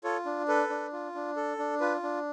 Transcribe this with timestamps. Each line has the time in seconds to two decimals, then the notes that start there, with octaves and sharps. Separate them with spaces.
0.04 F4 A4 C#5
0.25 D4
0.48 A4 B4
0.70 D4
0.92 F4
1.15 D4
1.36 A4
1.59 D4
1.80 F4 B4
2.03 D4